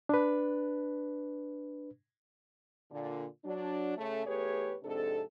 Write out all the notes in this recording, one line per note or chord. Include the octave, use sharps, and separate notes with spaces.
D4 B4
A#2 D3
F#3 D4
C#3 A3
E2 A3 G4 G#4 B4 C#5
F2 G#2 C3 D4 A4